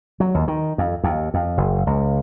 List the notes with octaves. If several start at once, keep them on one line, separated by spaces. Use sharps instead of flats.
F#3
D#2
D#3
F2
D#2
F2
F#1
C#2